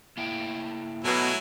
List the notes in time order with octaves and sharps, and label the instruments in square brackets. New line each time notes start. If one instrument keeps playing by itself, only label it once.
[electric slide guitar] A#3 E4 G5
[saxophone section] B2 [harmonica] F#3 E4 G#5 [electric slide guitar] A3 A4 D#5